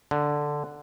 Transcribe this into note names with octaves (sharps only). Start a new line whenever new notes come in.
D3